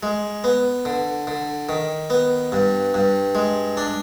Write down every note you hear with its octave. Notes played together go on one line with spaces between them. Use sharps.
G#3
B3
D3
D3
D#3
B3
G2
G2
G#3
D4